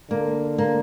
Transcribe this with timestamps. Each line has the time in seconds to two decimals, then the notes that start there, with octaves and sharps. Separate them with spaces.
0.10 D3 A#3
0.58 A#3